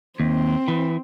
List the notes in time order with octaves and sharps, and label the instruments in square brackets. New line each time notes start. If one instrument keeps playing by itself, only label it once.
[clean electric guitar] D#2 [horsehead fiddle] C4
[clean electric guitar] E3